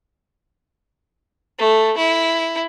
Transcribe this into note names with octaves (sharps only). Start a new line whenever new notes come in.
A3
E4